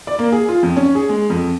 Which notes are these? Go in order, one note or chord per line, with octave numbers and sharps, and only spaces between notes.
D5
A#3
G#4
F4
F2
C#4
G#4
G#3
F2